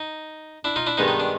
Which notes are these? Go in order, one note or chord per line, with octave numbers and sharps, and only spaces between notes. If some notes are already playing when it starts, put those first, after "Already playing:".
Already playing: D#4
D4 E4
D#4 F4
D4 E4
G2 D#3 G#3 B3 D#4
D#4
D4